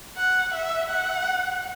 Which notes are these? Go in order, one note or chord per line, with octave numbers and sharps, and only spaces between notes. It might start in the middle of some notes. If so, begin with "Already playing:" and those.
F#5
E5
F#5